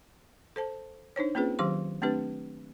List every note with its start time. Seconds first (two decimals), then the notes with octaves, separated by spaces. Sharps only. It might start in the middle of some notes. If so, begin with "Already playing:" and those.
0.56 A4 C5 A5
1.16 D4 D#4 C5 C#5
1.35 A#3 C4 C#4 F4 G#4 B4
1.59 D#3 F#3 G4 C5 C6
2.02 A3 C4 D4 G4 B4